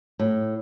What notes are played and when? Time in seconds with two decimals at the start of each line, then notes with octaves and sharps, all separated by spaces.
0.19 A2